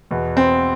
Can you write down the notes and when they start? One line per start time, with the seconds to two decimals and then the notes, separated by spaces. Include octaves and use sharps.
0.11 E2 B2
0.37 C4